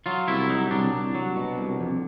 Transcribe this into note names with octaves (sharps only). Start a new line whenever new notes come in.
F#3 F4
C2 E4
F#3 D#4
C2 D4
C2
F#3
B2
C2
F2